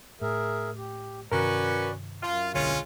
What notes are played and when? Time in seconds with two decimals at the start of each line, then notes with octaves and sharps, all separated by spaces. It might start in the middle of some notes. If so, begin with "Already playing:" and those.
0.21 A2 G#4 A#4 E5
0.76 G4
1.32 G2 C3 D#3 C#4 F#4 A#4 B4 D5
2.23 F#2 F4 F5
2.54 D1 B1 D3 G#3 C#4 F4